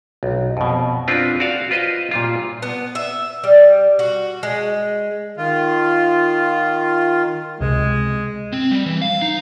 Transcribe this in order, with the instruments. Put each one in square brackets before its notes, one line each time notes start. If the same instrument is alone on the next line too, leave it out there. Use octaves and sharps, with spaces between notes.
[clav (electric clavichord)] B1
F2 B2
C4 D4 F4 B4
F#4 D5 F5
F4 B4 C5 D#5
A#2 G3 F4
[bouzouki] B3
E5
G3
F#4
G#3
[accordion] D#3 F4
[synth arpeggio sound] C#2 C3 [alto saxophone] G#3
[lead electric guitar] C4
G3
E3
F5
D#4